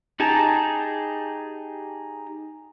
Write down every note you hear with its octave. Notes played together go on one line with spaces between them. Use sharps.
D#4 G4 G#4 A5 A#5